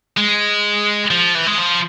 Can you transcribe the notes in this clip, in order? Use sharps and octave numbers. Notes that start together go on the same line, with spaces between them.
G#3
F3
E3
G#3
F3